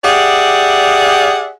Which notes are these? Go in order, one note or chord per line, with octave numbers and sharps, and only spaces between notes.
G4 G#4 D5 E5 F#5